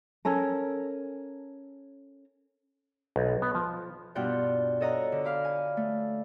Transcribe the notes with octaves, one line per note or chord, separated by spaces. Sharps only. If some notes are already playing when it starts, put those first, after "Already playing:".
C#4 A4 A#4
B1
B3
F3
G2 B2 D4 F4 F#5 G5
A4 C#5 D#5 F#5 A#5
D3
F5 B5 D6
G#5
A3